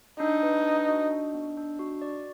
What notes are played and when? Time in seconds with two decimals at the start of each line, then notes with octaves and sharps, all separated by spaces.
0.20 D4 D#4
0.43 B4
0.66 D4
0.88 F#4
1.11 D4
1.34 B3
1.57 D4
1.79 F#4
2.02 D5